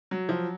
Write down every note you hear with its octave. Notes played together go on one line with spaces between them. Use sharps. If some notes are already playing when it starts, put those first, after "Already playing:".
F#3
F3